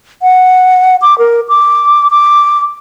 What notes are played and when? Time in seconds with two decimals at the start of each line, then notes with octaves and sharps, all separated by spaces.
0.22 F#5
1.02 D6
1.18 A#4
1.49 D6
2.11 D6